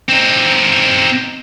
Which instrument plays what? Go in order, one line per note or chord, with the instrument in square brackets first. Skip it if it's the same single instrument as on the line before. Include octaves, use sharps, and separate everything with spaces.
[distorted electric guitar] C4 D#4